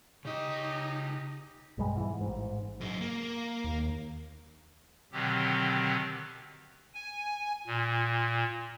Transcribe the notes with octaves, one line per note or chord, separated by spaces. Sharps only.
C#3 D#4 G4 D#5
B1 G2 G3 G#3
G#2 B2 E3
A1 G#2
F#2 G#3
A#3
D#2
B2 D3 D#3 F#3 C4 G4
G#5
A#2